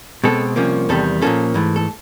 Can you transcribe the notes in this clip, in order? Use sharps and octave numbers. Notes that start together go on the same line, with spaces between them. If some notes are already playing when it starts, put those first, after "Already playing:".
B2 G#3 C4 A4
C2 C3 F3 A#3 C#4
E2 C3 D#3 G3 A4
A#2 F3 A#3 C#4 A4
G#2 E3 A3
A4